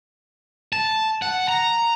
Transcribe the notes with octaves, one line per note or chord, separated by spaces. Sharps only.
A5
F#5
A#5